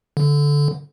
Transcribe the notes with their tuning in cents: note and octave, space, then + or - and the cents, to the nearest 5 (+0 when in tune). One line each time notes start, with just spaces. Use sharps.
D3 -15